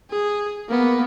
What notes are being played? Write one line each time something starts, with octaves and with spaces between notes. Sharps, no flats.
G#4
A#3 B3